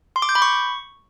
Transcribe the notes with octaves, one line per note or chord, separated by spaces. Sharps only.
C6
D6
G6
B5
C#6